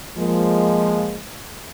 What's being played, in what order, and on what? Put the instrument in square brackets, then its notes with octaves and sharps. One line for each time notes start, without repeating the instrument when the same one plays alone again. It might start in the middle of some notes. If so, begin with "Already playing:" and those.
[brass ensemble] F3 G#3 A#3